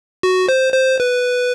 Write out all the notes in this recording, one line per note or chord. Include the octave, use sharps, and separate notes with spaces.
F#4
C5
C5
B4